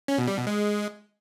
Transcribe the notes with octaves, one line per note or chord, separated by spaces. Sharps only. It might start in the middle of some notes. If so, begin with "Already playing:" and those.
C#4
B2
G3
B2
G#3